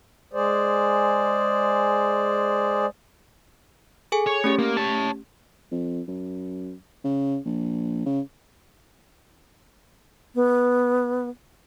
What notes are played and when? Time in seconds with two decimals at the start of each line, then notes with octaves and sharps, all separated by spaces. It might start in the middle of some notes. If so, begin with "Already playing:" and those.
0.33 G#3 G#4 C5 D5
4.12 G#4 A4 G#5
4.26 C#5
4.44 A3 C#4 G4
4.59 A#3
4.77 C#5 A5
5.72 F2
6.08 F#2
7.04 C#3
7.45 A#1
8.06 C#3
10.35 B3